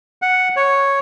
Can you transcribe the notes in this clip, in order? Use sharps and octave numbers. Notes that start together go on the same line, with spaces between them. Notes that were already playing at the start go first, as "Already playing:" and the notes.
F#5
C#5